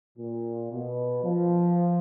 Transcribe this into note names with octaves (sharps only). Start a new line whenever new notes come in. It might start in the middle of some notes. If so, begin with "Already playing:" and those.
A#2
B2
F3